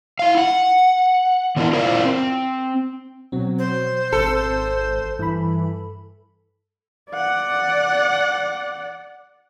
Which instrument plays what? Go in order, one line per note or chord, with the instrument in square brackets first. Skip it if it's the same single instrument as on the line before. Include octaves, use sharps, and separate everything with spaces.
[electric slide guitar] E4 F5
F#5
D3 B3 D4 E4 A#4
E4 F4 A#4 C5 D5 F5
C4
[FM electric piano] B2 C4 [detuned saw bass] F#3
[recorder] C5
[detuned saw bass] G#1 [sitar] A4
[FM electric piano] G2 B5 [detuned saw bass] E3
[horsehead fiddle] D5 F#5